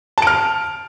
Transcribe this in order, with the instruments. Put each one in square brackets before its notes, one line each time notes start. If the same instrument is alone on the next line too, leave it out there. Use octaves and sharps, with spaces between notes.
[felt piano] A5
D7
F6